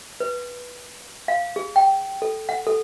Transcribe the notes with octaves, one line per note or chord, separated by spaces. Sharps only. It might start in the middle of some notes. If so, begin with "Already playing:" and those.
B4
F5
G#4
G5
A4
F#5
A4